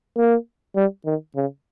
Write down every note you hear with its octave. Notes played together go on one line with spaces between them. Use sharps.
A#3
G3
D#3
C#3